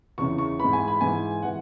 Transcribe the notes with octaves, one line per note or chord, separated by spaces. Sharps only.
E2 C#3 E3 C#6
C#6
G#2 E3 B5
G#5
B5
G#2 E3 G#5
E3 F#5